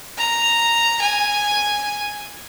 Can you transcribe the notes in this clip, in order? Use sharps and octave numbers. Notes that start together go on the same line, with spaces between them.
A#5
G#5